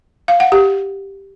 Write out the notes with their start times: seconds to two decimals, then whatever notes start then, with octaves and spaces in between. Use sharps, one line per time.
0.28 F5
0.40 F#5
0.52 G4